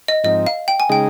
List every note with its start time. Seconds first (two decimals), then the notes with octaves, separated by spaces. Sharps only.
0.08 D#5
0.24 G#2 F3 C4 D#4 D#5
0.47 F5
0.68 G5
0.80 G#5
0.89 C#3 G#3 D#4 G#4 G5